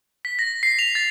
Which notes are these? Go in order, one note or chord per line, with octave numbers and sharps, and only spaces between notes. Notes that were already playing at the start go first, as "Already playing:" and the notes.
B6
A#6
C7
F7
A6